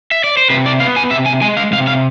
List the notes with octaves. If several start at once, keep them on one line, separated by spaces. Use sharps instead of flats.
E5
D5
C5
C3 B4
D5
B3 F5
G#5
C3 E5
G#5
G#3 G#5
F5
C3 F5
F5